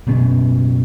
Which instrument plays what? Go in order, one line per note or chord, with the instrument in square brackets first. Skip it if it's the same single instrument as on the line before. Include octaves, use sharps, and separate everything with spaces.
[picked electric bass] F#1 B2 B3 C#4